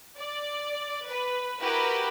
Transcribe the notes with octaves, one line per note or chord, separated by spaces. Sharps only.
D5
B4
E4 F#4 G4 A#4 B4